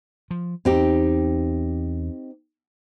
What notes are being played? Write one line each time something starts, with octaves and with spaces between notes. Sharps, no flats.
F3
E2 C4 D#4 G4